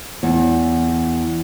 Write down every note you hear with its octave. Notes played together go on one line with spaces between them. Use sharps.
E2